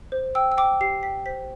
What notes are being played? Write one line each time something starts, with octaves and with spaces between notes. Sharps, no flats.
C5
G5 E6
E6
G5 D6
G4 C7
G5 B6
C5 B6